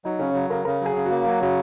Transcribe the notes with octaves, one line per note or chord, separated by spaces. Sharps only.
F#3 D#4
C#3 C#4
F#3
C#3 A#4
C#3 A#4
F#3
G#4
C#3
A#3 F#4
F#3 F#4
C#3 F#4